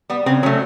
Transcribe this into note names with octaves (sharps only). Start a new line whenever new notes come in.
G3 B3
C#3 C4
F#3 A3 C#4